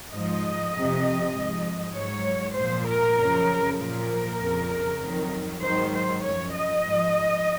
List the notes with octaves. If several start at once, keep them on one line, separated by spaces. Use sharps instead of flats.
G#2 F3 D#5
F2 C3 F3
G#2 F3
G#2 F#3 C#5
A#2 F3 C5
A#4
F#2 C#3 F3
A#2 F3 A#4
F2 C#3 F3
F2 D#3 F#3
G#2 D#3 F#3 C5
C5
F#2 F3 C#5
D#5
G#2 F3